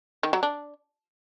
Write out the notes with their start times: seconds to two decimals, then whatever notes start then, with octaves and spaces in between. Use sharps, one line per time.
0.23 D#3
0.33 F#3
0.43 D4